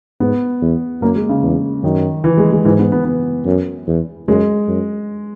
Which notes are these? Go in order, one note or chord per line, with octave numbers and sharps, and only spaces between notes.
G#2 B3
E2
F#2 A#3
G#3
C#3
E2
F#2 D#3
E3
G#3
G#3
G#2 E3
B3
B3
B3
F#2
E2
F#2 G#3
F#2